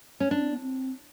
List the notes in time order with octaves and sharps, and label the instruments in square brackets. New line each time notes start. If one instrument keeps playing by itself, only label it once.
[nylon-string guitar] C#4
[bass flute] C#4 [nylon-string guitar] D4
[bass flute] C4
B3
C4